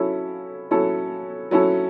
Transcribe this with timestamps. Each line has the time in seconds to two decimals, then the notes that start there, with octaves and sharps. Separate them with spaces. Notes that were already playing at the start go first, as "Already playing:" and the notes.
Already playing: F#3 C#4 E4 A4
0.71 F#3 C#4 E4 A4
1.51 F#3 C#4 E4 A4